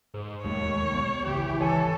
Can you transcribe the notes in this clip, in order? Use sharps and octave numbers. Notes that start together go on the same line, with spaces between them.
G#2
E1 D#2 G#3 A3 C#5
B1 G#3 B3
G#1 C#2 E3 G4
A4 C#5 G#5 C#6